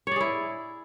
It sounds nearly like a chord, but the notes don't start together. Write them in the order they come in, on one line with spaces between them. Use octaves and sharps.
C#5 D5 G#4 E4